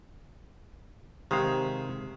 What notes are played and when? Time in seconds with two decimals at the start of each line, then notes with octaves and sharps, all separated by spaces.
1.31 C3 D#3 G#3 F5